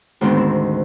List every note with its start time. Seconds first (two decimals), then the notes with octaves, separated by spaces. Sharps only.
0.21 D2 G#2 D#3 B3 C4
0.37 C4